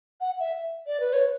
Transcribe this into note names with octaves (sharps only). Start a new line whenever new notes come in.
F#5
E5
D5
B4
C#5